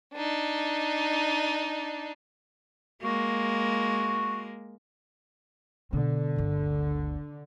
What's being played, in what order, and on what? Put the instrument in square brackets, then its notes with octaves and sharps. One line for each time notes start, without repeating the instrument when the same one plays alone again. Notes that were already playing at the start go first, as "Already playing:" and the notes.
[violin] D4 D#4
[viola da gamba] G#3 A#3 [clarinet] F#4
[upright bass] B2 [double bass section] D3
[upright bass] G1 D2